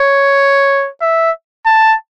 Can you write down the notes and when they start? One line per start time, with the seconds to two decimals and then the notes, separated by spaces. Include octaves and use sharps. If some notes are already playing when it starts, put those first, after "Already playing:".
Already playing: C#5
1.02 E5
1.66 A5